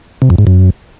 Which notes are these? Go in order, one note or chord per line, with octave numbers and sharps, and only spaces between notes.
C3
F2
G#2
F#2